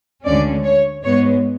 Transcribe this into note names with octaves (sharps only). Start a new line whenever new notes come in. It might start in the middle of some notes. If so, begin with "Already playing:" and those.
D2 D3 G#3 C#4 D5
C#5
G#2 G#3 B3 C#5